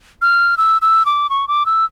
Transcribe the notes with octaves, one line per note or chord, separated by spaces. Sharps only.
F6
E6
E6
D6
C#6
D6
E6